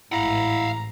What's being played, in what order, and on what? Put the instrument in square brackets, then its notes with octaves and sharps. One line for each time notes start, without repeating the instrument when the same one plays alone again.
[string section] A1 G#2 [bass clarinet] E4 [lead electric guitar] F5 F#5 [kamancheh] A#5